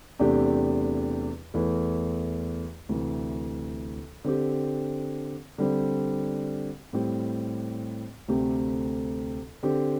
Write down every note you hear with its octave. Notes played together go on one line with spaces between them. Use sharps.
E2 C3 A3 D4 G4
E2 E3 A3
D2 C3 E3
D3 C4 G4
D3 G3 C4
A2 G3 C4 G4
D2 C3 A3 C4 G4
D3 C4 G4